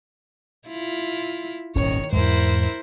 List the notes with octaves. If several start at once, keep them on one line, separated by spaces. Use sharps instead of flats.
E4 F4
D#1 G#1 D#3 C#4 C#5
E2 G#2 E4 A#4 C5